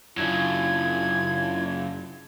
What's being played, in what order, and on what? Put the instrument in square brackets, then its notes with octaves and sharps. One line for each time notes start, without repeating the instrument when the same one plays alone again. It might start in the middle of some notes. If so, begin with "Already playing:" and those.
[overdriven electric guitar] F#2 C#3 [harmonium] D4 E4 F4 [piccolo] G#6